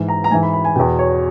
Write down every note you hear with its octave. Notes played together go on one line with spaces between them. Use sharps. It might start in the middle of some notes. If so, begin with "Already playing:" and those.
Already playing: G#2 E3
A#5
A#5
G#2 E3 G#5
B5
B5
G#5
E2 B2 G5
C#5